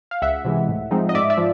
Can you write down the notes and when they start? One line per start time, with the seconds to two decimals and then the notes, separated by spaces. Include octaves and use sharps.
0.11 F5
0.22 C#2 E5 F#5
0.45 C3 E3 G#3
0.69 A2
0.91 F3 G#3 C4 D#4
1.09 D#5
1.15 G#2 D5 E5
1.30 D5 E5
1.37 F3